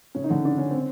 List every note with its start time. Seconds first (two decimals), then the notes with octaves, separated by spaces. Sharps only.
0.15 C#3 C#4
0.24 D#4
0.30 D3 D4
0.45 D4
0.58 C#4
0.71 C4